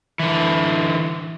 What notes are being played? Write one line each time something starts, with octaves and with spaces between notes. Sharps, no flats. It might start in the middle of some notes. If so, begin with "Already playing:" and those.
D3 E3